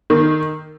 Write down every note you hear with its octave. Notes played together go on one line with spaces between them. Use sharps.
D#3